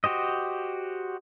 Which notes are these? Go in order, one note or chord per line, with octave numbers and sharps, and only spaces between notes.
F#4 G4 C5 D#5